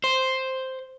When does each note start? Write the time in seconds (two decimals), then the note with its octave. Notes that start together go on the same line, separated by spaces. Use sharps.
0.04 C5